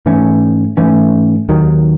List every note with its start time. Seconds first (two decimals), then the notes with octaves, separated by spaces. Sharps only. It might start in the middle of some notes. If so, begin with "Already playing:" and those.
0.06 G#2 E3 A3 C#4
0.77 G#2 E3 A3 C#4
1.49 D#2 D#3 F#3